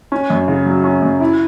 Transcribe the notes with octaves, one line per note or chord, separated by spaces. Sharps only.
C#4
F#2
C#3
F#3
C#4
F#2
E4